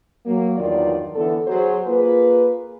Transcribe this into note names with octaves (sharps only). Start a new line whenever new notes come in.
F#3 A#3
E2 G2 D#3 F#3 F4 D5
D3 E3 B3 A4
F#3 G#4 C5
A#3 F4 G#4 B4